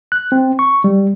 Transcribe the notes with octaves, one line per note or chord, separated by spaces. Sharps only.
F#6
C4
C#6
G3